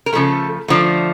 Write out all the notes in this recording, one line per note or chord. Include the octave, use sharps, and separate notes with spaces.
A#4
C#3 F3 A3 A4
D3 F3 A3